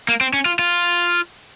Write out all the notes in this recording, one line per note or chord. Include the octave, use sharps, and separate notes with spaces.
A#3
C4
C#4
F4
F4